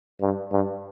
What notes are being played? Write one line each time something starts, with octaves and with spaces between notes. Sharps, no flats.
G2
G2